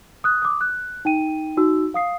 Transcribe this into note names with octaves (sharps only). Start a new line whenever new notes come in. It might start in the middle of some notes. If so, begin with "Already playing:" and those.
D#6 F#6
D6 D#6
F#6
D#4 G5 D#7
D#4 F#4 E6
F5 D#6 C7